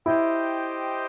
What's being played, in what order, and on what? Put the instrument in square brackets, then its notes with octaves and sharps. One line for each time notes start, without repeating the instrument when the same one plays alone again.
[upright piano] E4 [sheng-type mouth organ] G4 C5 D#5 G5